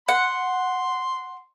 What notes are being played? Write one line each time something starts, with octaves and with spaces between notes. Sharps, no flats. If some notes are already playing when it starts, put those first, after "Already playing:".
F#5 C6